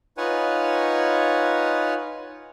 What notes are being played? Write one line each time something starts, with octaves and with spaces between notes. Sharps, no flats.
D#4 F4 B4 C#5 F#5 G#5